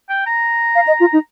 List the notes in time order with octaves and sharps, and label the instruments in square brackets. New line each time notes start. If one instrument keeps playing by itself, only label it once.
[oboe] G5
A#5
[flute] F5
D#5
F4
D#4